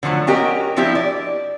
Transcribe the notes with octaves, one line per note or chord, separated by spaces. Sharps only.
D3 F3 F#3 A3
C#4 F#4 G4 A#4 D#5
F3 C4 D4 E4 G4
D5